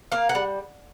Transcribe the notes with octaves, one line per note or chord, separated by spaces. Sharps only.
A#3 F5
F#5
G3